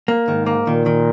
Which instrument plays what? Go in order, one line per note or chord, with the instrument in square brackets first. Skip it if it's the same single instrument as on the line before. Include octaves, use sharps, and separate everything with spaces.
[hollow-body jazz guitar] A#3
[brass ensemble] G#2 [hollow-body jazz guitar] D#3
[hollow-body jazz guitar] A#3
[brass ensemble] A#2 [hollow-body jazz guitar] D#3
[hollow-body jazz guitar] D#3